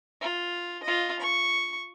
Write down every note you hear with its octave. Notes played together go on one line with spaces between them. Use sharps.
F4
F4 D#5
C#6